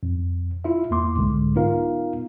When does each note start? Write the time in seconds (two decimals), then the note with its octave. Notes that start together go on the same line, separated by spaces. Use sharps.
0.03 F2
0.64 E4 F4 E5
0.91 E2 A#3 C6 D6
1.16 C2 G#2 D3 G#3
1.56 B3 D#4 F4 A#4 F5